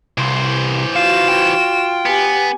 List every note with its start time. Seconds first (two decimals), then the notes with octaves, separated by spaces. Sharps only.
0.18 C2 E3 C5
0.96 F4 F#4 F5 E7
1.29 G5
2.06 B3 G4 G#5